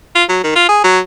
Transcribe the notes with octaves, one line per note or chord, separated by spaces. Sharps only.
F4
F#3
D#3
F4
G#4
F#3